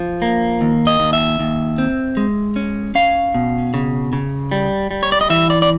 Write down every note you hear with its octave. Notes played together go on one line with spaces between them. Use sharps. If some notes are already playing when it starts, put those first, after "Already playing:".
Already playing: F3
A#3
D#2
D#5
D#2
E5
D#2
C4
G#3
C#4
C#4 F5
B2
C#3
C#3
G3
G3
C#5
D5
D#5
E3 E5
D5
D5